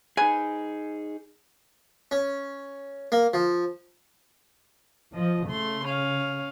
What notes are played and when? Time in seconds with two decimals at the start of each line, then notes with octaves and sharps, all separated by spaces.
0.17 D#4 G#4 B4 G#5
2.11 C#4
3.12 A#3
3.33 F3
5.15 F3 D#5
5.48 C#3 A3 C6
5.86 C#4 F5